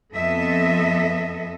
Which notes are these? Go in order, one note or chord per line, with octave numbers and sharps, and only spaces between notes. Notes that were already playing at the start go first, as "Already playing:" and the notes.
F2 B3 A4 D#5 E5